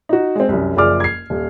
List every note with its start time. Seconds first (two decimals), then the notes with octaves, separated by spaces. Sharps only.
0.09 D#4 F#4
0.36 G#3 C4
0.49 C2 F#2
0.77 F#1 F3 G#4 D5 D6 F6
1.00 G#6 C7
1.30 D#1